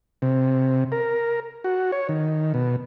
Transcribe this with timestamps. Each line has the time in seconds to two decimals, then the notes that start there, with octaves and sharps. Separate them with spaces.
0.22 C3
0.92 A#4
1.64 F#4
1.92 C#5
2.09 D#3
2.54 B2